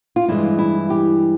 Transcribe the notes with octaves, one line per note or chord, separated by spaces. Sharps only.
F4
G2 E3 G#3 E4
E4
G4